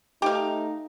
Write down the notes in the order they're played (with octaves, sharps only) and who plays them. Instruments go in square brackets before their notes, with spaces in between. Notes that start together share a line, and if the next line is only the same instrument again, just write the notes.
[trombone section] A3 D#4 [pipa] G4 F5